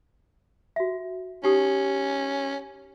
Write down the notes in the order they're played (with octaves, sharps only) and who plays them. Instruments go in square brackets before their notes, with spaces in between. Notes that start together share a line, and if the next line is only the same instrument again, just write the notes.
[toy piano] F#4 E5
[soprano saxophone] C#4 [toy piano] D#4 G4 D#6